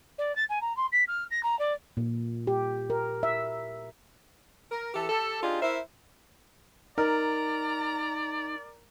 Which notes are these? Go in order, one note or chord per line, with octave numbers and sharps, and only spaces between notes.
D5
A6
G#5
A#5
C6
B6
F6
A#6
A#5
D5
A#2
G4
A#4
E5
A#4
E3 G4 A4
G4 A4
D4 D#4 F4 G4 G#4
E4 A#4 C5 E5
D#4 A#4 D5 A#5